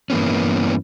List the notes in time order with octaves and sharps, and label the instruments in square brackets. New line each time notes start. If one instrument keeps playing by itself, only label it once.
[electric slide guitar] G2 E3 A#3 B3 C#4